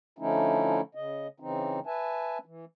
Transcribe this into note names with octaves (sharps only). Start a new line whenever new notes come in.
D3 F3 A3 C#4 D#4 E4
C#3 D#5
C#3 E3 C4 D#4
B4 E5 G#5 A5
E3